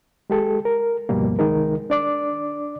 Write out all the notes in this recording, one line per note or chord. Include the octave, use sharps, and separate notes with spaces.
G#3 G4 A4
A#4
D2 G2 B2 F3 G3 A#3
C2 D#3 G#3 D#4 A#4
D4 D5 D6